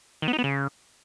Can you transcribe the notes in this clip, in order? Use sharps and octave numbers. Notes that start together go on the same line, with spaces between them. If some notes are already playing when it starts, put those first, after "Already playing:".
D#3
B3
D#4
B3
C#3